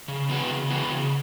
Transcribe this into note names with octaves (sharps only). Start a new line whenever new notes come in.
C#3
E3 B3 F#4
C#3
E3 B3 F#4
C#3